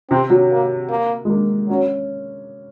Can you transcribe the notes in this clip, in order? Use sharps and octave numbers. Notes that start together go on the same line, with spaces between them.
C3 C4
F#3
A#3
A#3
G#3
A#3
F#3 C#4